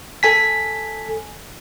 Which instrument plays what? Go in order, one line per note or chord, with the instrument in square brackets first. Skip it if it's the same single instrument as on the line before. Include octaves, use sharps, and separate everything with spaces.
[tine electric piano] A4 G#5 B6